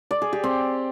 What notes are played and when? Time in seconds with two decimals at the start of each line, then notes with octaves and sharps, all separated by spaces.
0.11 D5
0.22 G#4
0.33 G4
0.44 C4